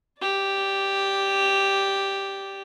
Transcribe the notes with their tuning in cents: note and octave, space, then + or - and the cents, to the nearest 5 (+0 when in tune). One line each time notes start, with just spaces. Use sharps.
G4 +0 D5 -5